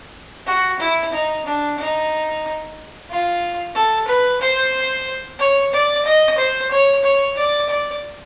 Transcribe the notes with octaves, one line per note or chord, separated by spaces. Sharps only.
F#4
E4
D#4
D4
D#4
F4
A4
B4
C5
C#5
D5
D#5
C5
C#5
C#5
D5
D5